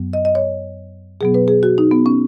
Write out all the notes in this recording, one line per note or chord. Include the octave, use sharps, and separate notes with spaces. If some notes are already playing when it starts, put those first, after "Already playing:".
Already playing: F#2 F#3 B3
D#5
D#5
C#5
B2 F#3 B3 G#4
B4
G#4
F#4
D#4
B3
C#4